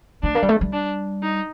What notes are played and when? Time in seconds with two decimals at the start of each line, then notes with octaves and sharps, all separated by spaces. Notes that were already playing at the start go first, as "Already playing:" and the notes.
0.23 A3 D4
0.35 A#3
0.43 G3
0.49 A3
0.61 G3
0.73 D4
1.23 D#4